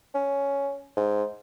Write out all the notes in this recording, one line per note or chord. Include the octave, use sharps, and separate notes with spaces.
C#4
G#2